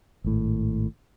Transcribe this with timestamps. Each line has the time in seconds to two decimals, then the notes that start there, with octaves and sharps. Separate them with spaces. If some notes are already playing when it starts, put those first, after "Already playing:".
0.24 G#1 A2